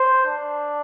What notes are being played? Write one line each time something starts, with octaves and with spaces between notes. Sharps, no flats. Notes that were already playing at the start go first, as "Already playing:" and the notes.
Already playing: C5
D4